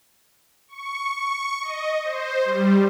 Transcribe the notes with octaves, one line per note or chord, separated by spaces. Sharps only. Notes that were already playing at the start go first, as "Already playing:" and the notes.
C#6
C#6
D#5
C5
G3